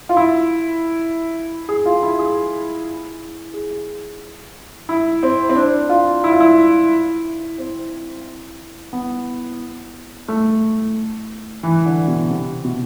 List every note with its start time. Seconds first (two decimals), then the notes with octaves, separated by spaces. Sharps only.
0.09 F4
0.17 E4
1.69 G#4
1.86 F4
2.03 E4
2.19 G#4
3.54 G#4
4.89 E4
5.23 C4
5.49 C4
5.56 D4
5.89 F4
6.24 E4
6.32 F4
6.40 E4
7.58 C4
8.93 B3
10.28 A3
11.63 E3
11.85 D3
12.08 B2
12.30 C3
12.65 B2